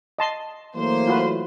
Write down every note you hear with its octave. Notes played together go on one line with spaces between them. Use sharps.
D#5 A5 C6
E3 F#3 A3 A#3 C5
F4 F#4 B4